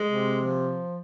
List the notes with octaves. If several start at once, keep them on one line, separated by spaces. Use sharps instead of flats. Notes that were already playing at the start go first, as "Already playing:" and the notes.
Already playing: G#3
C3
F3